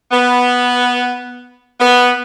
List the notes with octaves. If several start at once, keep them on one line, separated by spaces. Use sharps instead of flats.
B3
B3